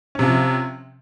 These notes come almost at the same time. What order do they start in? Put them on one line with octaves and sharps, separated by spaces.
C#4 C3 F3